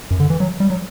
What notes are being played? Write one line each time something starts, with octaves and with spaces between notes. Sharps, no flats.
F#2
D3
E3
F#3
G3
F#3